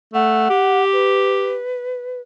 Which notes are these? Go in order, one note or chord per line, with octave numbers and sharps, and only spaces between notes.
A3 F#5
G4
B4